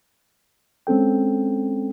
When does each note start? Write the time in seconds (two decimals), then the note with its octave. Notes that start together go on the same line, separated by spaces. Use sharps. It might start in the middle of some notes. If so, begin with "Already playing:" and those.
0.87 G#3 C4 C#4 A4 G5